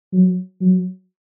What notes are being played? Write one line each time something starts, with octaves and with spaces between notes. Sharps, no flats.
F#3
F#3